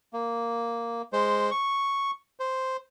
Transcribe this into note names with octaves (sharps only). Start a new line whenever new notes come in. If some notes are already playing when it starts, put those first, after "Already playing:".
A#3
G#3 C5
C#6
C5